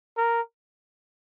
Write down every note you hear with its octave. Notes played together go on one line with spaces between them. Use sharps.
A#4